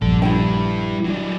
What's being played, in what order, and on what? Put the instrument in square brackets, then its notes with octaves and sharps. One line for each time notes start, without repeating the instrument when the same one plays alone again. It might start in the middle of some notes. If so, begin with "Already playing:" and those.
[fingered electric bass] A#1 G2 [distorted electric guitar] D4 A4
[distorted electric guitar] G3 D4 [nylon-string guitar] E4 G5
[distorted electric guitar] F#3 D4